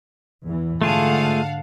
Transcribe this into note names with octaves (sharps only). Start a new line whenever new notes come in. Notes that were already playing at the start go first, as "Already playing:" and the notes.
E2 E3
G#2 D3 A3 F4 G#4 F5 F#5 A5